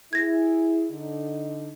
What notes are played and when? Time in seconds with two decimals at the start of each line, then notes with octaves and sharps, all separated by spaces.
0.13 E4 G#4 G#6 A#6
0.91 D3 D#4